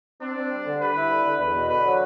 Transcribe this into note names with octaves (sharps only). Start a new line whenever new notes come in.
C4 D4
C4
G3
D3
G3 B4
E4
D3
D3
E2 B4
B2
D3 B4
F#3